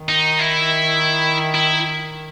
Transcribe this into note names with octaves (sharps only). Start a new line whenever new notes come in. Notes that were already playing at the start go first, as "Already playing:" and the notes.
Already playing: D#3
D#4
E4
E4